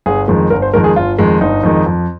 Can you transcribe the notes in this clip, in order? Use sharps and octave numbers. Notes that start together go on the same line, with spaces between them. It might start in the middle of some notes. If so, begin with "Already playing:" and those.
G1 G#4
F2 D#3 G#3
G1 A#4
C5
F2 D#3 G#3 A#4
G#4
G1 F4
F2 D#3 G#3
G1 D#4
F2 D#3 G#3
F2